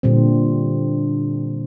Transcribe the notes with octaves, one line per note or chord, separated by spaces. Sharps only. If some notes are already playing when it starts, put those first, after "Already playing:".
A#2 D3 G3 C4